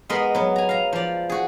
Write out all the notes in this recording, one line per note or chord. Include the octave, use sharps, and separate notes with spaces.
G#3 B3 A#4 D#5 B5 C6
F#3 B3
G#5 A#5
F5 A#5
F3 D5
F#4 G#4